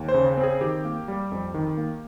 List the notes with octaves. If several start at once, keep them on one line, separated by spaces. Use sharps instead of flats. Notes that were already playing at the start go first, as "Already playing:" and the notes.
Already playing: D#2
C5
C#3
C4
G#4
D#3 G4
A#3
G3
F2
D#3
A#3